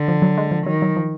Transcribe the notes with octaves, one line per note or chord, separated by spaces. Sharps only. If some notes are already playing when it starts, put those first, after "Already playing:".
Already playing: D3
F3
F#3
G#3
F3
D#3 F#3
F#3
F3